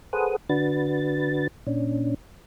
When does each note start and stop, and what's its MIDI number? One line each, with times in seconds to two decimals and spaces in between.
0.13 0.36 68
0.13 0.36 69
0.13 0.36 71
0.13 0.36 72
0.13 0.36 78
0.13 0.36 87
0.49 1.48 50
0.49 1.48 62
0.49 1.48 66
0.49 1.48 71
0.49 1.48 93
1.67 2.14 46
1.67 2.14 61
1.67 2.14 62